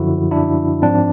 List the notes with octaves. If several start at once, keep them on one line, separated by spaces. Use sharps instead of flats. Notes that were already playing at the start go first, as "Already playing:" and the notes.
Already playing: F#2 D3 F3 E4 F#4
D4 E4
G#2 F3 C4 D4